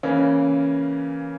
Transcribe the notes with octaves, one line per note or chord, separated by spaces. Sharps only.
C#3 E3 A#3 C#4